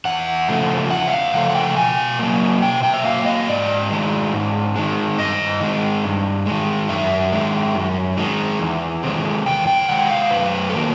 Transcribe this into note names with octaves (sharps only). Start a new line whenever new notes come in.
E2 F#5
C#3 F3 A3
E2 F#5
E5
F5
C#3 F3 A3 F#5
F#5
G5
B2 G#5
F#3 A#3
B2 G5
G5
E5
F#3 A#3 F5
D#5
G#2 D5
D#3 G#3
G#2
D#3 G#3
G2 D#5
D#3 G#3
G2
D#3 G#3
F#2 E5
D#3 G#3
F#2
D#3 G#3
E2
C3 D#3 G#3
E2 G5
G5
C3 D#3 G#3 F#5
F5
F#2 B4
A4
D#3 F#3 A#3 A#4